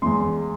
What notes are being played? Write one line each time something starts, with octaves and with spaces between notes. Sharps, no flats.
E2 E3 G#3 C6